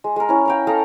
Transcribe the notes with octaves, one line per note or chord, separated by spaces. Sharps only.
G#3
G#3 A#4
C#4 E4
A#4 F5 G5
A4 D#5 F5 A#5